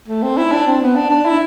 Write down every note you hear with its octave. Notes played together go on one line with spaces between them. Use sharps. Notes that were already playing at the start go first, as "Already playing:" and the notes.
A3
C4
E4
D4
C4
B3
D4
D4
E4